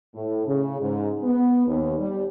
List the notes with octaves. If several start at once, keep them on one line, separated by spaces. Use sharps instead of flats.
A2
C#3
G#2
B3
D#2
G3